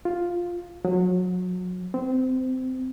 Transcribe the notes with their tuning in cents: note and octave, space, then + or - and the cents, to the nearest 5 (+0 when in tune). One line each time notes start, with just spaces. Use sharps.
F4 +5
F#3 -30
C4 -20